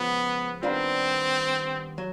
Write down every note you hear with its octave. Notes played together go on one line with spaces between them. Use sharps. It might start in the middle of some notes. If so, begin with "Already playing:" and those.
Already playing: C#3 F3 G#3 B3
D#3 G3 B3 C4 D4 F4
F#3